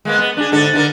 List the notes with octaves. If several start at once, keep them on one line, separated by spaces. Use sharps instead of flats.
G#3 A#3 B3
B3
D4 G#4
G#2 D3 A4
D3 E4 A#4